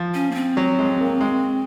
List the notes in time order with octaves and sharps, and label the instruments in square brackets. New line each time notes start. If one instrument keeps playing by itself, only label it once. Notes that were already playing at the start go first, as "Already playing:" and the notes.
Already playing: [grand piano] F3
[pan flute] C#4
A#3
C4
[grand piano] F#3
G#3
A#3
G#3